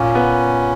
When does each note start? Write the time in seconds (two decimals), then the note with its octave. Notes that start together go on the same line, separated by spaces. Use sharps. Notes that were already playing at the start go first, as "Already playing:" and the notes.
Already playing: A#2 C#4
0.15 B3